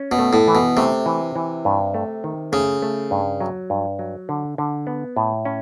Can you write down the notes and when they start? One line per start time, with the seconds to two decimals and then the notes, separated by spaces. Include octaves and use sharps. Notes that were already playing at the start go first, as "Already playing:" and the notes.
Already playing: C#4
0.12 B2
0.19 A3
0.33 A2
0.48 E3
0.55 B2
0.77 C3 A3
1.06 E3
1.36 E3
1.65 G2
1.94 A3
2.24 D#3
2.52 C#3 A3
2.82 A3
3.11 G2
3.40 F#3
3.70 G2
3.99 F#3
4.29 D3
4.58 D3
4.87 B3
5.17 A2
5.45 C#4